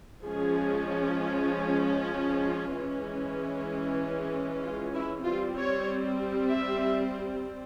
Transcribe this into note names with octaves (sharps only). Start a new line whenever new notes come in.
F3 G#3 C#4 G#4
F4
F4
E3 G#3 C#4
F4
E4
G3 C4 F4
C#5
E5